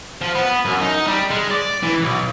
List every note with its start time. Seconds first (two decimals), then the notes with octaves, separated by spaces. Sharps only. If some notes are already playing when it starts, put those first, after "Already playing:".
0.21 F3
0.35 B3
0.65 F#2
0.82 D#4
1.07 G3
1.31 G#3
1.51 D5
1.83 E3
2.02 B1